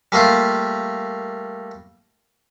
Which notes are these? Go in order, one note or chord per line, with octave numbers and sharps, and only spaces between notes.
G3 A3 A#3 F4